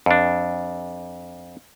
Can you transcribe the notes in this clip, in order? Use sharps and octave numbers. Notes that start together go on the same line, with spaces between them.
F2 D4